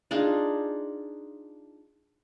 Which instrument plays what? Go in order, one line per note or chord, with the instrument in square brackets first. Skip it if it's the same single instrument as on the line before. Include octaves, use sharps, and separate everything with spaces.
[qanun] D4 D#4 F4 G#4